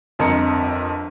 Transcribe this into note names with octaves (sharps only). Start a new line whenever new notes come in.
G1 F2 A#4 D#5 C#7